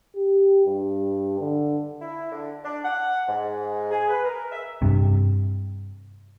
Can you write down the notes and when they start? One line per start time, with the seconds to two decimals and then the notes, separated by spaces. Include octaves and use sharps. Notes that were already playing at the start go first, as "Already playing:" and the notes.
0.15 G4
0.66 G2
1.40 D3
2.01 E4
2.31 D3
2.64 D4
2.84 F#5
3.28 G#2
3.91 G#4
4.09 B4
4.25 A#4
4.52 E5
4.82 G2 C3